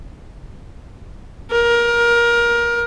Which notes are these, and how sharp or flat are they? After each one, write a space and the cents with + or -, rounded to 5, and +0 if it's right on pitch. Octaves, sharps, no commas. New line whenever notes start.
A#4 +20